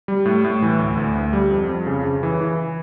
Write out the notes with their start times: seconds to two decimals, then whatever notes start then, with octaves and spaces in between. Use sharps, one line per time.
0.08 G3
0.25 A2
0.44 A2
0.62 E3
0.79 D2
0.97 D2
1.15 D2
1.33 G3
1.51 F2
1.69 F2
1.87 C#3
2.04 C#3
2.23 E3
2.41 E3